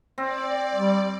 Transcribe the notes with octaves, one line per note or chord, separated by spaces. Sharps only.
C4 D5
G3